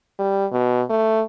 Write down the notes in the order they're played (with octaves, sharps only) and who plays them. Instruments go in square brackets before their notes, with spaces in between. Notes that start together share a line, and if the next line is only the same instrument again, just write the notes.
[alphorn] G3
B2
A3